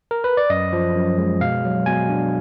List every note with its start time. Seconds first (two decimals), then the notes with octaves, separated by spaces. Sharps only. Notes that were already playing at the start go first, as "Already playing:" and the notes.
0.11 A#4
0.24 B4
0.37 D5
0.50 F#2 D#5
0.73 F3
0.96 F#2
1.18 G#3
1.41 B2 F5
1.64 F#3
1.86 B2 G#5
2.09 D4